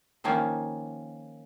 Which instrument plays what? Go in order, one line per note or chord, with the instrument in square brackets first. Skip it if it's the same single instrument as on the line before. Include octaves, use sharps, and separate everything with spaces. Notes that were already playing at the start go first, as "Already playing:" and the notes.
[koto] D#3 F3 A#3 C#4 D#4